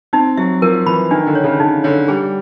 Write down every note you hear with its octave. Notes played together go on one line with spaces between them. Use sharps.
C4 D#4
F#3 E5
F3 A#4
E3 B5
D#3 D4
D3
C#5
C#3
C#3 D#4
D3 C#5
G3 G#4